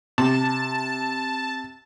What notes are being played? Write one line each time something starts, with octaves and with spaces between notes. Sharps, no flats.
C3 A5